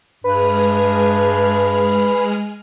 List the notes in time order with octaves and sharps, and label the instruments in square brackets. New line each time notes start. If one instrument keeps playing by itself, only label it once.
[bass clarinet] G2 [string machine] G#3 G#4 F6 [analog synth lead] B4